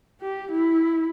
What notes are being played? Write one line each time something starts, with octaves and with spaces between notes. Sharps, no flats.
G4
E4